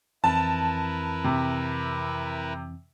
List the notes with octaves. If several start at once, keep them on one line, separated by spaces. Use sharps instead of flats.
F2 E3 C4 E4 A#4 B4 A5
C3